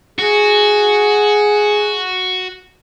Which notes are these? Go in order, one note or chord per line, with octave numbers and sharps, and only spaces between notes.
F#4 G#4